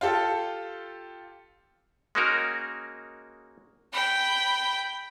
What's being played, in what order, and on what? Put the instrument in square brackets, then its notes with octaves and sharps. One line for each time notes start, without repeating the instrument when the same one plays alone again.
[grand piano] F4 G4 A4
[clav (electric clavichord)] G#3 A#3 C#4 D#4 F#4 A#4
[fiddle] G5 B5